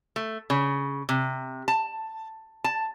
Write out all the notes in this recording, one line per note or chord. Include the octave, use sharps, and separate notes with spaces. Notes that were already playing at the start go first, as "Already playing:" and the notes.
A3
C#3
C3
A5
A5